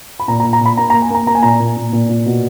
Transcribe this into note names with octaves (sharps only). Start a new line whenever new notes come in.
B5
A#2 A#5
A#5
A#2
A#5
A#2 B5
A#3 A#5
A#5
A#3
G#5
A#3 A#5
A#3 A#5
G#5
A#2 A#5
A#2
A#2
A#2
A#2
B2